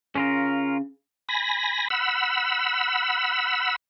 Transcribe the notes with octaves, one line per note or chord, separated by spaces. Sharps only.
C#3 C#4 F4 A#4
G#5 B5 A#6
F#5 B5 E6